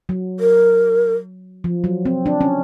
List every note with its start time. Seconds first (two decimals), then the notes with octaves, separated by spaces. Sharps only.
0.09 F#3
0.40 A#4
1.64 F3
1.84 F#3
2.05 C4
2.26 D4
2.41 C#4